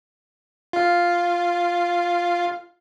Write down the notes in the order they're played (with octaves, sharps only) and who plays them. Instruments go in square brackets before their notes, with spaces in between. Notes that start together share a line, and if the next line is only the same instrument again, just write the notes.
[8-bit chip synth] F4 F5